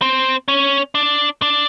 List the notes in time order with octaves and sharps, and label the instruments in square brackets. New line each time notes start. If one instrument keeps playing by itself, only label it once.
[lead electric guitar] C4
C#4
D4
D4